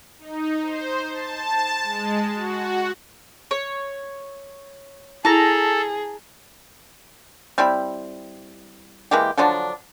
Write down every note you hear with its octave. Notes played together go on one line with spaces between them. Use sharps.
D#4
C5
A5
G#3
F#4
C#5
E4 G#4 A4 A5 A#5
G3 C4 E4 B5
E3 G#3 A#3 G4
D3 F3 F#3 D4